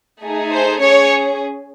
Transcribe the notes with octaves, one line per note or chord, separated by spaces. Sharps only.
A3 D#4 G#4
C5
C#4 G#4 C#5